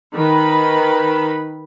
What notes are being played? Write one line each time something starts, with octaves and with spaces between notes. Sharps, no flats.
D#3 B4 B5